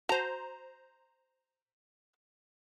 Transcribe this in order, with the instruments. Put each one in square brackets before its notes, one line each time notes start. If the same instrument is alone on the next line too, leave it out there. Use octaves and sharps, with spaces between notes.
[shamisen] F#4 A5 [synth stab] C5 A#5